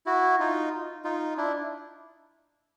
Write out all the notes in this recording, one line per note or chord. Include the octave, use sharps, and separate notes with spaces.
E4 F#4
D#4 F4
D#4 F4
D4 E4